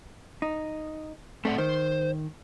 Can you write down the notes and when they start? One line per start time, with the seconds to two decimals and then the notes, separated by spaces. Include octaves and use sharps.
0.42 D#4
1.45 A3 C4 D5 F#5
1.58 D#3 C5